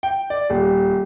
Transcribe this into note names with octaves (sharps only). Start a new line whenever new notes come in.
G5
D5
D#1